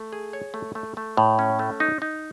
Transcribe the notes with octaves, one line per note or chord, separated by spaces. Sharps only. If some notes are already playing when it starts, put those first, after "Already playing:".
Already playing: A3
G#4
C#5
A3
A3
A3
A2
C#4
A3
D#4
D#4